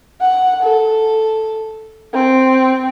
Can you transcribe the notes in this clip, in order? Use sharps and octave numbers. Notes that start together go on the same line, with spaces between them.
F#5
A4
C4